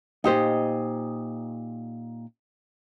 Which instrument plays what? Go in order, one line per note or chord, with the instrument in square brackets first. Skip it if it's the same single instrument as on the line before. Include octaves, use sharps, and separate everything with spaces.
[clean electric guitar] A#2 D#5 [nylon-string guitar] D#4 G4 C5